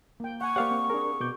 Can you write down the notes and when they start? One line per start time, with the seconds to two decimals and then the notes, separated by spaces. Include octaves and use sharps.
0.20 A#3 G5
0.41 F#5 G#5 C#6
0.56 A#3 G4 C5 D5 F5 F#5
0.71 C4
0.90 D4 G#4 A#4
1.20 B2 F#4 D6 G6